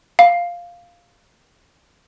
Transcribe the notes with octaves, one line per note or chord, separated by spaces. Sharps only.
F5